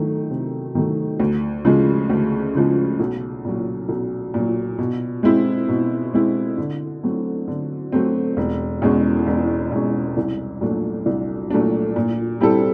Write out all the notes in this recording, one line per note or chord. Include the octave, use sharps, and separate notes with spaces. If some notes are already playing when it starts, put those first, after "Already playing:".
Already playing: D#3 F#3 A3
C3
D#3 F#3 A3
D2
C#3 F3 G#3
D2
C#3 F3 G#3
B1
A#2 F#3
B1
A#2 F#3
B2
G#3 C4 E4
B2
G#3 C4 E4
D3
F#3 A3 C4
D3
F#3 A3 C4
E1
E2 B2 G#3 C#4
E1
E2 B2 G#3 C#4
C2
A#2 F#3 A3 D4
C2
A#2 F#3 A3 D4
A#2
G3 C4 E4 A4